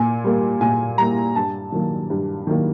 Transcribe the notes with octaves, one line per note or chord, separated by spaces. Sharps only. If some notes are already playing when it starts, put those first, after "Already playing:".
Already playing: A#2 G#5
G3 A#3
A#2 G#5
G3 A#3 A#5
G2 A5
D#3 F#3 A#3
G2
D#3 F#3 A#3